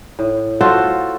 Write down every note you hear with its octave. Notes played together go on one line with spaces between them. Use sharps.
A2
F4 F#4 A4 C5